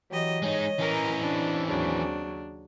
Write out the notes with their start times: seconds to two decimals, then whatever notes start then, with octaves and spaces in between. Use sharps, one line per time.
0.10 E3 F#3 G4 D#5
0.43 G#3 D#4 C#5 D#5
0.79 E3 C#4 A#4 A#5
1.20 C4 D4
1.68 D#2 C#3 F#3 D4